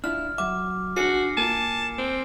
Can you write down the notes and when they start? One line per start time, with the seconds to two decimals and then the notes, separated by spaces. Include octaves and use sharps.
0.04 D4 E4 F4 F6
0.38 F#3 E5 D6
0.96 D4 F#4 G#4 C7 C#7
1.37 A#3 F4 G#5 A5
1.98 C4